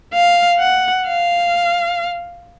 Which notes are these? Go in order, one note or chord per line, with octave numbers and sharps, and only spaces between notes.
F5
F#5
F5